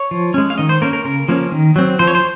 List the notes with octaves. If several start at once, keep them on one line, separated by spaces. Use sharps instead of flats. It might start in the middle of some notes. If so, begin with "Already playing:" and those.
Already playing: C#5
F3
G#3 C#4
F5
D#3 D#5
C5
A#3 C#4 A#4
A#4
C#3 A#4
F3 A#3 C#4
D#3
F#3 C4
F3 C5
C#5
C5